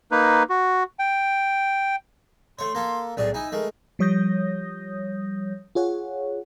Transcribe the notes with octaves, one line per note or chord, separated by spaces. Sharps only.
A#3 D#4 B4
F#4
G5
A3 C#5 C6
A#3 A4
B1 A2 G#4 D5
D#4 E4 G#5
G#3 A3 A#4
F3 G3 C#5 D#6 G6 A#6
F4 G#4 C#5 F#5